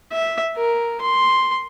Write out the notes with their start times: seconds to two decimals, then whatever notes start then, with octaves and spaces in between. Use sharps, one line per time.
0.12 E5
0.57 A#4
1.01 C6